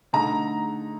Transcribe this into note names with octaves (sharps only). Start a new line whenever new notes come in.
D3 A3 D#4 A#5